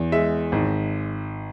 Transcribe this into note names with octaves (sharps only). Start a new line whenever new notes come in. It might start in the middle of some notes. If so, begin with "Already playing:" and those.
Already playing: E2
G#3 E5
G#1